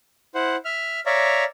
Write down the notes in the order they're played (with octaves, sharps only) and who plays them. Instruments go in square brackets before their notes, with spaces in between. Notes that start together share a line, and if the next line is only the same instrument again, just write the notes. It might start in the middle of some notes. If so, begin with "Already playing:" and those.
[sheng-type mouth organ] E4 C5 F#5
E5 F6
C#5 D5 E5 F5 A#5